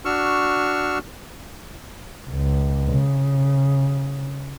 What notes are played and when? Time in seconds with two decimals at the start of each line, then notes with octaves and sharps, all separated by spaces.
0.05 D4 F#4 C#6 E6 F6
2.30 C#2
2.93 C#3